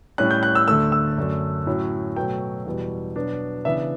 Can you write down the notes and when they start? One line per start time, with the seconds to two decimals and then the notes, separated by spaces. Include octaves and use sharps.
0.18 A2 G3 C#4 F#6
0.31 G6
0.43 F#6
0.55 E6
0.68 D2 D3 A3 E6
0.92 E6
1.18 F#2 D3 A3 D4
1.67 A2 F#3 C#4
2.16 B2 F#3 A3 G5
2.66 E2 B2 G3
3.16 B2 F#3 B3 D4
3.65 C#3 E3 B3 D4 E5